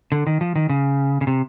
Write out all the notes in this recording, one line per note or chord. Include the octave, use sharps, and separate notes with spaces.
D3
D#3
F3
D#3
C#3
C#3
C3